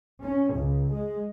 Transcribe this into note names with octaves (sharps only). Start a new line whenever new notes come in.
C#4
C#2
G#3